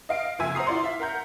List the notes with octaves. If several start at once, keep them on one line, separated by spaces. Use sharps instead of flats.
D#5 F5 D7
F#1 F2 E5 G#5 E6
C5 F#5 A#5 D#6 C7
E4 F4 D5 C6
E5 F5 B6
A#4 F#5 A#5 G6